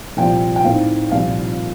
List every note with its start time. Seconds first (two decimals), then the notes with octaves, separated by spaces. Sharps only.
0.17 C2 A#2 F3 G5
0.56 G5
0.65 A2 A3 C4 D#4 F5
1.12 C2 A#2 F3 F5